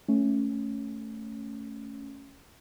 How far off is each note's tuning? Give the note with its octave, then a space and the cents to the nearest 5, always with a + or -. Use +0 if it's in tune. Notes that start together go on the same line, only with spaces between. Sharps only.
A3 +0 C#4 +0